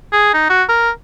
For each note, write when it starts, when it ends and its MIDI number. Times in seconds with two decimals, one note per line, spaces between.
0.13 0.32 68
0.34 0.45 63
0.50 0.63 66
0.69 0.90 70